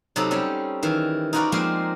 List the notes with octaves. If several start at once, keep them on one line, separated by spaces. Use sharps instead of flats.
C3 F#3 D#4 A4 B5
G3 C4 C#4 C#5
D#3 E3
D#4 F4 F#4 A#4 B4 D5
F3 G#3 A#3 C4 A#4